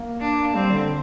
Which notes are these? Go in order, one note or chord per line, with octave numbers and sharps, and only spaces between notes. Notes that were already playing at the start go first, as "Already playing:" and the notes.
Already playing: A#3
D4
G3 C4
D3